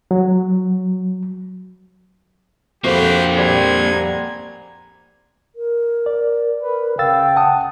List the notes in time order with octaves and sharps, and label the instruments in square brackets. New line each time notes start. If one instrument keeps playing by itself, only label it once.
[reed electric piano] F#3
[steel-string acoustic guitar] F2 C4 [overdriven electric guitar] A#3 C5 [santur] F#4 F5 G5 [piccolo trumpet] G4
[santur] G3 C6 D6 [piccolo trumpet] G#6
[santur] F#5 G#5 A#5
[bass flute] A#4
[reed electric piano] D5
[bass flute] A#4 [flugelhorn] B4
[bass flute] C#3 [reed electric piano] F5 E6 A6 [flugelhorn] G5
[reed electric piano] F#5 A5 D#6